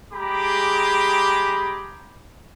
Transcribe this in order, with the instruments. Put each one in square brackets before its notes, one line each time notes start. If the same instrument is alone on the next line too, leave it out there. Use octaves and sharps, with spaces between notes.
[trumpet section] G#3 G4 G#4 A#5 B5 D6